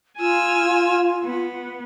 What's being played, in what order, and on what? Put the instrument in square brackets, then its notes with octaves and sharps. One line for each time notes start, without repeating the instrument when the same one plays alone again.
[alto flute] F4 [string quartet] G#5 E6 F6
[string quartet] B3